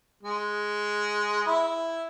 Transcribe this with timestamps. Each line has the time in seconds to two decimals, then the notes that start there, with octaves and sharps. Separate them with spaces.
0.23 G#3
1.46 E4